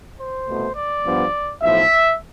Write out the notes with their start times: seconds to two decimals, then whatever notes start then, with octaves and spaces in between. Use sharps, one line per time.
0.19 C5
0.48 C2 B2 A3
0.76 D5
1.06 G2 F3 B3
1.63 B1 A2 F3 E5